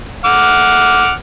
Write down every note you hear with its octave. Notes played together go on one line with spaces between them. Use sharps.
F#5 D6 F6